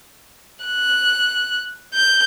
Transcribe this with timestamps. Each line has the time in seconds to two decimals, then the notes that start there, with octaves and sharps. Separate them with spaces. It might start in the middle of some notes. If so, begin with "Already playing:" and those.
0.65 F#6
1.94 G6